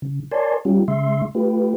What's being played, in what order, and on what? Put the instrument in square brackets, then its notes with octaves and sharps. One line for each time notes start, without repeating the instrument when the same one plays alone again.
[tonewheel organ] C#3
A#4 C#5 D5 G#5 A5 C6
G3 C#4 F4 G4
C#3 G#3 E5 C6
A3 F4 G4 B4